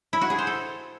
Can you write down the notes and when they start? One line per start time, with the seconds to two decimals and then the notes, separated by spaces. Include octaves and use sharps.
0.13 E4
0.21 F#4
0.30 G#4
0.38 C5
0.47 A4